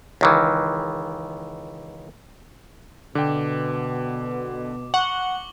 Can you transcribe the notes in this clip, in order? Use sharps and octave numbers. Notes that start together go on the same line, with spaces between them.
C#2 D#3 E3
B2 D3 G5 D6
F#5 C#6 F#7 G7